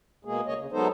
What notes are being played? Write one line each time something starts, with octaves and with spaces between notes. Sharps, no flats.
B2 G#3 A#3 G#4
D2 C#3 A#3 C#5 D#5
C#3
F#3 G#3 B3 D#4 A4 C5